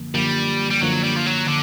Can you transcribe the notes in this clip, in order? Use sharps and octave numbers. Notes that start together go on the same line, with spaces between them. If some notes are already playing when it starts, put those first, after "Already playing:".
Already playing: F#2 D3 F3 A#3
F#2 D3 F3 G3 A#3
G3
F#2 D3 F3 F#3 A#3
G3
F3
F#3
D3